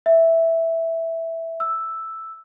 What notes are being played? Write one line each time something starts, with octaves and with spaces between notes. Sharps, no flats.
E5
E6